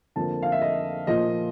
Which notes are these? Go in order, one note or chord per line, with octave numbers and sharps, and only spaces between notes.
F2 D3 F3 A#3 A5
F5
E5
D#5
A#2 F3 A#3 D#5